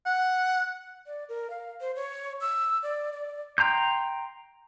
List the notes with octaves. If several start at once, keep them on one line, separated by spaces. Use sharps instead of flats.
F#5
D5
A#4
F5
C5
C#5
E6
D5
D5
G5 A#5 C6 G6